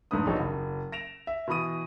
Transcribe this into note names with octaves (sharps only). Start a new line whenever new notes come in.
F1 G#2 D3 A3 B4 D#6
A#1 B2 D#4 G#4 C#5
F#1
A#6 D7 E7 F7
E5
B2 E3 B5 D#6 D#7